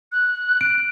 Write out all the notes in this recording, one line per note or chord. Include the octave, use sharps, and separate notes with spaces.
F#6
D7